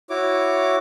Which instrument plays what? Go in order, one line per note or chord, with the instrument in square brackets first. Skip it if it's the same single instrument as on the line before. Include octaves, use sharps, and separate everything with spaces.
[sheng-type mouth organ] E4 F#4 C#5 D6